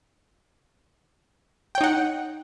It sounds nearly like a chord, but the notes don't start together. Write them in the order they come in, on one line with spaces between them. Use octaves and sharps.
G5 C#5 D#4 F#5